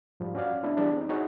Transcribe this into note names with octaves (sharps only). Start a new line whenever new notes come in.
G#2 F3 G3
C#4 F#4 D5 F5
G#3 B3 D4 E4
E3 G3 B3 D4 G#4
C4 D#4
D#4 E4 F#4 G#4 C#5